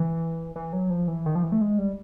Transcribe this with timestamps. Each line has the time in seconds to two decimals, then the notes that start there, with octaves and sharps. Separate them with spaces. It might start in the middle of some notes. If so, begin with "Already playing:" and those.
Already playing: E3
0.56 E3
0.73 F#3
0.90 F3
1.08 E3
1.26 D#3
1.35 F3
1.43 E3
1.52 A3
1.61 G#3
1.78 G3